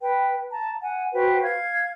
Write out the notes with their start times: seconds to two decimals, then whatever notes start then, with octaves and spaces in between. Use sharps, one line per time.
0.01 B4 G5
0.50 A5 A#5
0.81 F#5 G#5
1.13 F#4 B4 C5 G5
1.43 F5 G#6